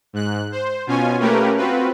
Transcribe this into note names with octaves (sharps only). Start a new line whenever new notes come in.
G#2 F#6
C5
B2 C#4 F4 G#5
A3 A#3 C#4 G4 A#4 B4
C4 F4 F#4 B4